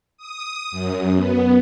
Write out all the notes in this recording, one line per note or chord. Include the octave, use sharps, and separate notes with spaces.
D#6
F#2
B3